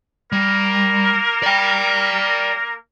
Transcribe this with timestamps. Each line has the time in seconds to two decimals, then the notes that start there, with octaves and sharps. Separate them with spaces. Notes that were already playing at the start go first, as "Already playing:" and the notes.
0.32 G3 A#3 A#4
1.43 D5 G5